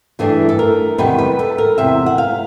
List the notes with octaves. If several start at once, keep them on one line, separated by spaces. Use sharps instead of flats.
G2 E3 A3 D4 G#4
A4
A#4
E2 C3 D#3 G3 B3 B4
B4
A4
A#4
E2 C3 E5
F#5
F5